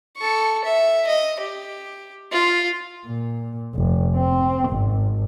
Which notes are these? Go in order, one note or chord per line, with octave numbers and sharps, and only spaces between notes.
A4 C#6
E5
D#5
G4
F4
A#2
F1
C4
G#1